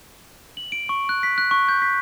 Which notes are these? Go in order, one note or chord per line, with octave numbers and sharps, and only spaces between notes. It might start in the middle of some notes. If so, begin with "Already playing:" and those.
F#7
D7
C#6
F#6
B6
F#6
C#6
G6
B6